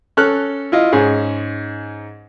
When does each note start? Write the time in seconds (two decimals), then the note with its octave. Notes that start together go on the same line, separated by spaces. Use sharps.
0.17 C#4 A4 F6 F#6
0.72 E4 F4 D#5
0.92 G#2 C#4 G#4